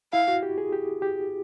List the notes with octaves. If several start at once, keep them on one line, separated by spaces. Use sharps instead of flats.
E4 F5
F#4
G4
G#4
G4
G4